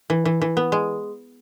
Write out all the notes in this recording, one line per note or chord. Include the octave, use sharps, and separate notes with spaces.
E3
E3
E3
B3
G#3